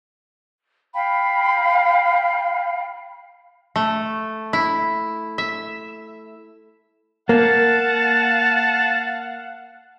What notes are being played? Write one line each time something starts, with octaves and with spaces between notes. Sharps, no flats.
F5 G5 B5
A3
E4
E5
A#3 F5 F#5 A5